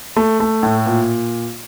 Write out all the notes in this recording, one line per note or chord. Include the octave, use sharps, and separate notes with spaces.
A3
A3
A2
A#2